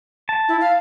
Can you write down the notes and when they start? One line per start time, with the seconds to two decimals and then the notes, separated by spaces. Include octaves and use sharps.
0.29 A5
0.49 E4
0.61 F5